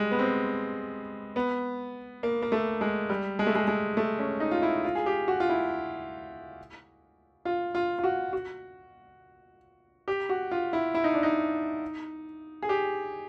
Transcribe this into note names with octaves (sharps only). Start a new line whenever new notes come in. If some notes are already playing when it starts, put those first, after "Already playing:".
Already playing: G3 G#3
B3
C4
B3
A#3
A#3
A3
G#3
G3
G#3
A3
G#3
G#3
A3
C#4
D#4
F4
E4
F4
G#4
G4
F#4
F4
E4
F4
F4
F4
F#4
F#4
G4
F#4
F4
E4
E4
D#4
D4
D#4
G#4
G4